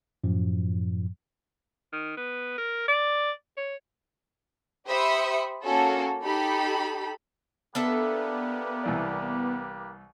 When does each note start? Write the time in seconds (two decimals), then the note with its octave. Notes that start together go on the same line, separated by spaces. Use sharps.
0.24 F#2 A2 F3
1.92 D#3
2.17 B3
2.58 A#4
2.88 D5
3.57 C#5
4.87 G4 C5 E5 B5 D#6 C#7
5.63 A#3 C#4 F#4 A4
6.23 D#4 G4 A4 B5
7.75 A#3 B3 D4 G4 A4 B4 E5
8.83 C2 E3 D5